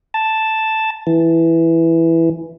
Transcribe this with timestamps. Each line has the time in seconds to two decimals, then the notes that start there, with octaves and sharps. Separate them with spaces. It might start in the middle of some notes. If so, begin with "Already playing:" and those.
0.14 A5
1.07 E3